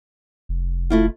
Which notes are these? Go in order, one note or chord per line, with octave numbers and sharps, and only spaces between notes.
F1
A3 E4 F4